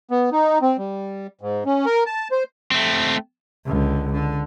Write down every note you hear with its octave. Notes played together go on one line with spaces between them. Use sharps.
B3
D#4
C4
G3
G#2
C#4
A#4
A5
C5
A3 C4
C#2 D3
D3